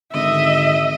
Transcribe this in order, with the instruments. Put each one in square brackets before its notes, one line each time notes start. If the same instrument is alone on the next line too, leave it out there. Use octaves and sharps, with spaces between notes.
[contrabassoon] G#1 [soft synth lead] D3 [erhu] D#5 [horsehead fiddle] E5